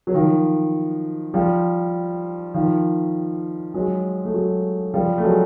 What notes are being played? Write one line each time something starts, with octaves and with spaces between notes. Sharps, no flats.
F#3
D#3 F3
F3 G3
D#3 F3
F#3 G#3
A3
F#3 G#3
F3 G3
A3
F#3 G#3